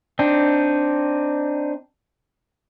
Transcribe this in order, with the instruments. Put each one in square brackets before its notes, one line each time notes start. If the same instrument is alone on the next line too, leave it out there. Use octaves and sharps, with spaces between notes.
[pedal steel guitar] C4 D4 D#4